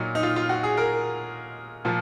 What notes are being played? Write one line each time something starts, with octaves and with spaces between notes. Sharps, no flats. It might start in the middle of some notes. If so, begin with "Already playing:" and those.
Already playing: A#2 F#3 D#4
D#4
F4
F4
F#4
G#4
A#4
A#2 F3